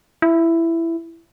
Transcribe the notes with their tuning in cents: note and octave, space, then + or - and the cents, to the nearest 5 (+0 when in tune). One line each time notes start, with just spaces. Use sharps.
E4 +10